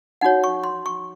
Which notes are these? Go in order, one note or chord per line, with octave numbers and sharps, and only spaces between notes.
D#4 F#4 C#5 F#5
C#6
C6
C#6